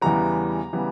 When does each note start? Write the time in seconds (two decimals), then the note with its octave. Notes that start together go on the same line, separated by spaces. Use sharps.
0.01 E2 C#3 E3 G3 B3 A#5
0.73 C#3 E3 G3 B3